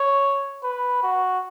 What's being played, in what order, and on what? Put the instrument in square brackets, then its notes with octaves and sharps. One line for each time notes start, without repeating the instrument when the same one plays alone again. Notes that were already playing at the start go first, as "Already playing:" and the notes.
Already playing: [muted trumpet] C#5
B4
F#4